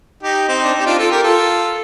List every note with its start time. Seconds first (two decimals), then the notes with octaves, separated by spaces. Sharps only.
0.23 D#4 G4
0.48 C4 D#4
0.63 D4
0.73 C4 D#4
0.80 G4
0.86 D4 F4
0.98 F4 A4
1.11 G4 A#4
1.23 F4 A4